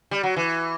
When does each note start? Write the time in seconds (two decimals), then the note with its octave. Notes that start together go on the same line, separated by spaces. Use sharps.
0.11 G3
0.23 F#3
0.36 E3